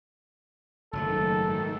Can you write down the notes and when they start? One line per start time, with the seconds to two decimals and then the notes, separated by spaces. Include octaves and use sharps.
0.93 F#1 G#2 D#3 F#3 A3 A4